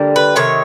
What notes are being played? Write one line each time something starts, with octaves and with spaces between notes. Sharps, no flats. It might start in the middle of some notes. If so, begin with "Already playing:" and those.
Already playing: D3 G3 A#3
B4
C3 D#3 C#5